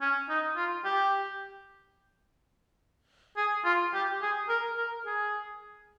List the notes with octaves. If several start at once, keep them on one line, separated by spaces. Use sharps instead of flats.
C#4
D#4
F4
G4
G#4
F4
G4
G#4
A#4
A#4
G#4